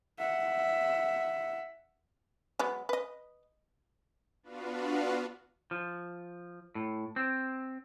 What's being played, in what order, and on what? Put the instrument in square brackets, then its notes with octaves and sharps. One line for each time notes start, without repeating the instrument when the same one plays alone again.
[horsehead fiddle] E5 F#5
[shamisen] F#3 G#3 B3
B4 D#5
[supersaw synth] B3 D4 F4 F#4 B4 F5
[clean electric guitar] F3
A2
C4